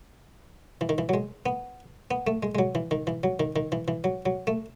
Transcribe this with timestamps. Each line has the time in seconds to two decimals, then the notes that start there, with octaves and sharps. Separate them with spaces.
0.81 E3
0.89 D#3
0.98 E3
1.09 F#3
1.14 G#3
1.46 B3
2.11 B3
2.27 A3
2.43 G#3
2.55 G#3
2.59 F#3
2.75 E3
2.91 D#3
3.07 E3
3.23 F#3
3.40 D#3
3.56 D#3
3.72 E3
3.88 E3
4.04 F#3
4.26 F#3
4.47 A3